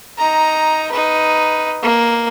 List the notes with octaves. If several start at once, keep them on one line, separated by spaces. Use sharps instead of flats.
D#4 A#5
D#4 B4
A#3